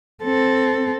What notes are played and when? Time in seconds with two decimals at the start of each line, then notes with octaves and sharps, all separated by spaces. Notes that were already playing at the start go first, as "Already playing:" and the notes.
0.23 C4 A4